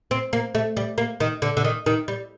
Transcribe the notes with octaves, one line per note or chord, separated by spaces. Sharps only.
C4
A#3
A3
G3
A#3
D#3
D3
D3
D#3
D#3
G3